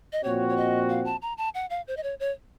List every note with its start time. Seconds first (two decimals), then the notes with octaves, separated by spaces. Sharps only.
0.13 D#5
0.24 A#2 F3 C4 F#4 C#5
0.49 C#5
0.57 D#5
0.89 F5
1.05 A5
1.22 A#5
1.38 A5
1.55 F#5
1.70 F5
1.88 C5
1.97 D#5
2.03 C#5
2.20 C#5